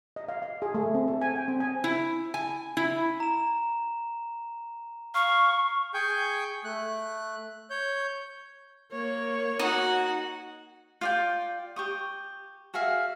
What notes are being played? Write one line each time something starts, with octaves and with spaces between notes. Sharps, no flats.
D#5
F5
F5
G#4
A3
C4
A4
G#5
G5
C4
G#5
E4
G#5
E4
A#5 E7
F5 C#6
G#4 G5 G#5 C#6 G6
A3 F#6
C#5 G6
A#3 C#5
D#4 F#4 F#5
F4 D5 G5
G4 C#6 D#6
F#4 G#4 E5 F5